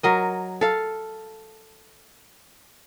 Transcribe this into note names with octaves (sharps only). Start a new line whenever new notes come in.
F#3 A#4 D#5
A4 F5